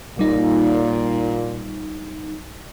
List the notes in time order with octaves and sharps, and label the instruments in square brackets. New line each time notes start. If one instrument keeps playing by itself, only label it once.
[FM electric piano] A1 G3 D#4 [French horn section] A#2